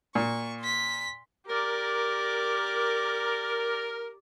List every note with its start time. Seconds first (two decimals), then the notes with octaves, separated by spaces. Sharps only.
0.15 A#2 C#6
0.60 C6 B6
1.48 G4 A#4 D5